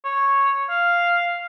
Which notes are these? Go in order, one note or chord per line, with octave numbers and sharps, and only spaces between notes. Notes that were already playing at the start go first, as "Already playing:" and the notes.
C#5
F5